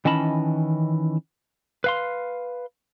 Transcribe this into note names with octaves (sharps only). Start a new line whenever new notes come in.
D#3 E3 C#4 D#5 A5 B5
B4 F5 C6